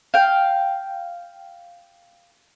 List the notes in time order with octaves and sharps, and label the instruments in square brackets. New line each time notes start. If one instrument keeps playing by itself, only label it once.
[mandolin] F5 G5